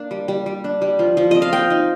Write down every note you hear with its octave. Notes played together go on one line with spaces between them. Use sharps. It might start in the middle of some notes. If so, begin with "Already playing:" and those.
Already playing: A#3 D4
G3
G3
G3
D4
G3
F3
F3
C4 D#5
F5
C4 G5
D#4